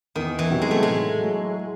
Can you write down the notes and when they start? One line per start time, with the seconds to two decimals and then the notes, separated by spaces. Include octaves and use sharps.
0.15 E2 D#3
0.39 E3
0.49 C3 D#3 F#3 B3
0.62 G#3
0.71 A3
0.83 A2 G#3
1.19 F#3 A3